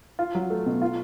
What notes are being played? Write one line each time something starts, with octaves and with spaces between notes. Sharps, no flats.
F4
F#3
A3
B2
F4